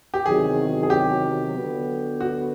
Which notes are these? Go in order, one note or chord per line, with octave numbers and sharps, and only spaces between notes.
G4
E2 C3 D#3 F#3 G#4
G#4
G4
D3 F#3 B3
F#4